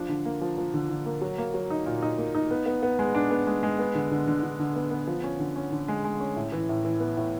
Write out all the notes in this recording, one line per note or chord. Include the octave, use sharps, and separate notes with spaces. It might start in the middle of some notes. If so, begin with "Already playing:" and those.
Already playing: F3 D4
D3
A#3
F3
F3
D3
D3
A#3
F#3
A#3
F#3
D#4
A#2
D#4
A#3
D#4
B3
B3
B3
G#3
D4
B3
G#3
G#3
B3
D3
D3
D3
D3
D3
B3
B3
F3
C#4
D3
C#4
D3
G#3
G#3
C#4
A2
E3
A2
E3
B3
A2